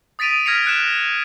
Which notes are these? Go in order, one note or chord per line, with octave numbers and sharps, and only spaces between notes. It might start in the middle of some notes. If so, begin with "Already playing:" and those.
D#6 A6 B6 D7 D#7 F7
F6 G#6 A#6 B6 C#7 F7
F6 F#6 C#7 E7